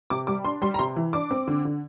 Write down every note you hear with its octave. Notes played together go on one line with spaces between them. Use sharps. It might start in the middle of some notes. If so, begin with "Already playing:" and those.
C3 D6
G3 D6
D4 C6
G3 C6
A#5
C3 C6
E3
D4 D6
C4
D3
D3